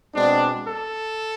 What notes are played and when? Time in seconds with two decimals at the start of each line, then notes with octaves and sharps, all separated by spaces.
0.15 B2 G#3 C4 D4
0.67 A4